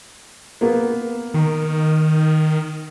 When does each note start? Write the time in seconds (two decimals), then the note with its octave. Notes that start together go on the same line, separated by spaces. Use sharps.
0.61 A#3 B3
1.34 D#3